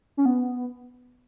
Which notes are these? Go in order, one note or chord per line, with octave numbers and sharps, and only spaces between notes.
C#4
B3